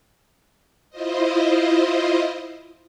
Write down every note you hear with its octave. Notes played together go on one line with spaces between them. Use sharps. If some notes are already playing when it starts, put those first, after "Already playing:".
E4 F4 C5 D#5